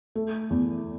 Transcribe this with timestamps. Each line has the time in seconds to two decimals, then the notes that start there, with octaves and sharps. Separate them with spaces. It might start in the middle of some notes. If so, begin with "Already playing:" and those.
0.15 A3
0.50 E2